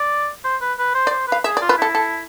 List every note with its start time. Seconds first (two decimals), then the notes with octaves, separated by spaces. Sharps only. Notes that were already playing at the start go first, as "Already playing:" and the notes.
Already playing: D5
0.44 C5
0.61 B4
0.78 B4
0.95 C5
1.07 D5
1.11 C5
1.28 B4 F5
1.44 G#4 E5
1.57 D5
1.61 F4
1.69 B4
1.78 E4 A4
1.95 A4